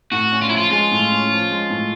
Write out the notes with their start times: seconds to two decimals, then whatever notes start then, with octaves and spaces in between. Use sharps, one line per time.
0.11 A2 F#4
0.32 C#4
0.42 F4
0.50 F3 E4
0.57 F4
0.71 G#3 F4
0.91 A2
1.11 C#4
1.30 F3
1.51 G#3
1.70 A2